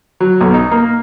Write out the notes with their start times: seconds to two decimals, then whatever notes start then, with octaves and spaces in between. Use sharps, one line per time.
0.20 F#3
0.41 B1
0.54 D#4
0.71 A#3